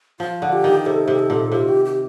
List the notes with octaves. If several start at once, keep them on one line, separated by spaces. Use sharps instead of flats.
F3 F4
D3
G4
D#3
C3 A4
C3
G4
A4
A#2
C3 F4
G4
G4